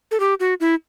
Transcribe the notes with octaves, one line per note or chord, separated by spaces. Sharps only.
A4
G4
F#4
E4